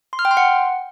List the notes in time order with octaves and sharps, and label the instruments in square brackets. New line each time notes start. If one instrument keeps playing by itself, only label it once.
[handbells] C6
F6
G5
C6
F#5